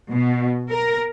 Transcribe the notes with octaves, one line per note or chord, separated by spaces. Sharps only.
B2
A#4